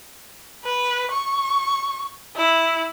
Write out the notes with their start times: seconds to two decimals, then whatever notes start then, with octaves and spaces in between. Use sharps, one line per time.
0.65 B4
1.11 C#6
2.36 E4